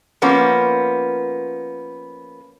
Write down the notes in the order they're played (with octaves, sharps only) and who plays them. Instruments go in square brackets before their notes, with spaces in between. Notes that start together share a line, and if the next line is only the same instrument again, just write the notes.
[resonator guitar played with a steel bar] F3 A#3 B3 C#4